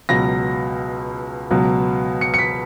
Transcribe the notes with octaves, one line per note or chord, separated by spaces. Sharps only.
C#2 B2 F#3 A#6
C#2 B2 F#3
C#7
C#7
B6